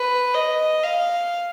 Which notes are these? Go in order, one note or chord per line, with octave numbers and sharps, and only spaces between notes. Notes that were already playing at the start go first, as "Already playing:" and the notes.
Already playing: B4
D#5
F5